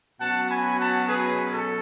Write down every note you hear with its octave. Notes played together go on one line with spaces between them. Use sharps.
B2 F#3 C#4 F#5 A5
G#5 B5
F#5 A5
G#4 B4
A4